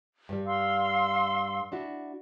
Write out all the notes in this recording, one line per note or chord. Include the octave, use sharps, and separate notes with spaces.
G2 G3
F5 C6 E6
D4 E4 F#4